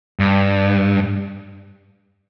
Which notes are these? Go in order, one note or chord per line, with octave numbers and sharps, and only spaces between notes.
G2